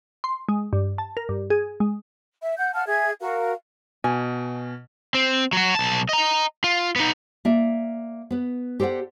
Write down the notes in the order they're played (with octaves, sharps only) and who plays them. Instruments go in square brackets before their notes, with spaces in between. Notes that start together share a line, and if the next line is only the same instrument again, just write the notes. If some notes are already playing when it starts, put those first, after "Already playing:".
[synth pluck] C6
G#3
G2
A5
A#4
G2
G#4
G#3
[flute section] E5
F#5 G6
F5 F#5 A5 F6
G#4 E5 G#6
F#4 A#4 F5
[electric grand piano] B2 [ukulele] G#5
[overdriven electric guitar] C4
F#3 F#4
B1 A5
D#5 A#5
F4
B3 D#4
[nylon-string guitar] A#3 D5 E5
B3 B4
G4 A4 C5 D5 F#5